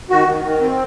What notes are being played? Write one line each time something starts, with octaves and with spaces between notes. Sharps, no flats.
D#3 F#4
D#3
D#3
C4